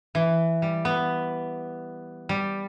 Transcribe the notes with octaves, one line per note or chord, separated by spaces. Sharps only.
E3
G3
B3
G3